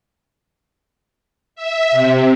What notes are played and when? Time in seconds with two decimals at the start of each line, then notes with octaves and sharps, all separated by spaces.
1.56 E5
1.92 C3